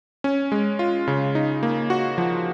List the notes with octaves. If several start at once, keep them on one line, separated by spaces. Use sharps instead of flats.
C#4
G#3
F4
C#3
D#4
A#3
F#4
F3